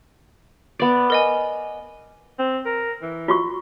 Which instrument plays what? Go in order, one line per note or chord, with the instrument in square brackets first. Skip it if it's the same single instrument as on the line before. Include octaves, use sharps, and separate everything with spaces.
[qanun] B3 D5
[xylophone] A#4 D#5 G#5
[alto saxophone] C4
A#4
E3
[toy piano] F4 F#4 C#6